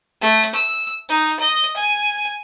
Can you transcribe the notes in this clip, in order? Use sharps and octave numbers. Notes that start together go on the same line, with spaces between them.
A3
E6
D#4
D#5
G#5